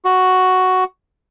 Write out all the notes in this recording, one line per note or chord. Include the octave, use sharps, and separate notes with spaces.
F#4